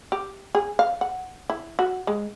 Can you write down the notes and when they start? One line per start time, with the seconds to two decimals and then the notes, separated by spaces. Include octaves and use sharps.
0.12 G4
0.55 G#4
0.79 F5
1.01 F#5
1.50 E4
1.79 F#4
2.07 G#3